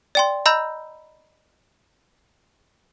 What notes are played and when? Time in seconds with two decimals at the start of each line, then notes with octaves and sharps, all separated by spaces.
0.15 D5 G5 C6
0.46 D#5 A#5 B5 E6 G6